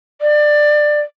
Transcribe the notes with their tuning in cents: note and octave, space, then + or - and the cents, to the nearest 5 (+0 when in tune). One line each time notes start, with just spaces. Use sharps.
D5 +20